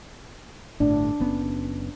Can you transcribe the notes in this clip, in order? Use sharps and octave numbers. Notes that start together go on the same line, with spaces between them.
G1 A2 D4
F#1 B3 C#4